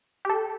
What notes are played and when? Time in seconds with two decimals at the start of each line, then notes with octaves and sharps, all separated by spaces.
0.25 G4
0.29 A4